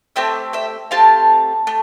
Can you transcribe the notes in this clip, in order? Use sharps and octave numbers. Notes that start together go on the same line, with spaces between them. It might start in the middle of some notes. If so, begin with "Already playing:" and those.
A3 C4 G4 E5 G5
E5 G5
A3 C4 G4 F5 A5
A3